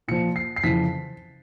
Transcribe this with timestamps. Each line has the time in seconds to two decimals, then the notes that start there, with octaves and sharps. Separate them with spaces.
0.08 A#2 F3 C#7
0.36 C7
0.56 C7
0.64 F2 C#3 E3 B6